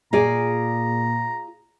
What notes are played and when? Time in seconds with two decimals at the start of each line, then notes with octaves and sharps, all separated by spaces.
0.13 A#2 F4 G#4 D5 A#5